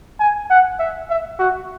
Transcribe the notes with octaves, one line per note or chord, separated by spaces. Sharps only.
G#5
F#5
E5
E5
F#4